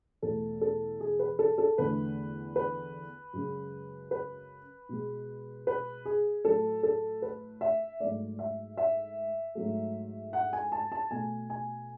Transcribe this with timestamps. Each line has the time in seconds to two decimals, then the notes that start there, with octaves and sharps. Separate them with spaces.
0.22 E2 B2 A3 A4
0.61 A4
1.00 G#4
1.19 B4
1.39 A4
1.58 A4
1.78 E2 D3 A3 B4
2.56 B4
3.33 F#2 C#3 G#3
4.11 B4
4.89 B2 G#3
5.67 B4
6.05 G#4
6.45 A2 F#3 A3 A4
6.83 A4
7.22 B4
7.61 E5
8.00 G#2 F#3 A3 D5
8.39 E5
8.77 E5
9.55 G#2 F#3 A3
10.33 F#5
10.53 G#5
10.72 A5
10.92 A5
11.11 B2 A3 G#5
11.50 G#5